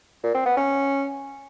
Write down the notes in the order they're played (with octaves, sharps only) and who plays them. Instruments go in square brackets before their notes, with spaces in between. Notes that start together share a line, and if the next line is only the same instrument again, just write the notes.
[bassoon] A#2
C4
B3
C#4